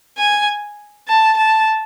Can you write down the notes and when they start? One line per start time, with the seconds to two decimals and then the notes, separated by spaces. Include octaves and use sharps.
0.18 G#5
1.08 A5
1.37 A5